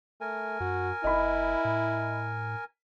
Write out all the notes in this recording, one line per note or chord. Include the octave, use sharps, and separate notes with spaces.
A3 A#4 G#5
F#2 F#4
F#1 E4 D#5 B5
A2